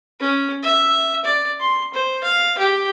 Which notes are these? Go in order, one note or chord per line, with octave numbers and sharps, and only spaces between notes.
C#4
E5
D5
C6
C5
F5
G4